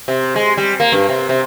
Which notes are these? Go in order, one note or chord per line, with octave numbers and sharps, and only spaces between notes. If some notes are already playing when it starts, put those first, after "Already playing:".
C3
G#3
G3
A#3
G2
C3
C3